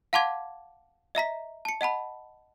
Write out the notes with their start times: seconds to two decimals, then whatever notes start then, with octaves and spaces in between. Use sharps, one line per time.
0.13 F5 F#5 A5 C6 D6 G#6
1.15 D#5 E5 A#5 B6
1.65 A5 C#7
1.81 D#5 F#5 A5 B5